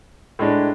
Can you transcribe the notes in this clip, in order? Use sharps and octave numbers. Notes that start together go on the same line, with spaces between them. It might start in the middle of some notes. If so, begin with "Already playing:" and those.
A2 G#3 D4